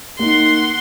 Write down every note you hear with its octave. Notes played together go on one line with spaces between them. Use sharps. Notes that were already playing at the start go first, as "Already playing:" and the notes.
A#3 D#4 F#5 C6